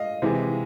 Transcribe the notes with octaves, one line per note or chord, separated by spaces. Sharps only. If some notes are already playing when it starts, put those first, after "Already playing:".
Already playing: D#5 F5
C3 E3 G#3